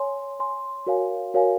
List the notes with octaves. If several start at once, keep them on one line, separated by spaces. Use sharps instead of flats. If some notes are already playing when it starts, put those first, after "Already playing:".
Already playing: C#5 G#5 C6
C#5 G#5 C6
F#4 A#4 C#5 F5 G#5
F#4 A#4 C#5 F5 G#5